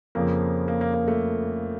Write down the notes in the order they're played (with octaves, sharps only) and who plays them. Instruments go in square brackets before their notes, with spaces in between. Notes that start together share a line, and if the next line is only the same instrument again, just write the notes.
[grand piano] F2 C#3 F3 A#3
A#3
A#3
A#3
A3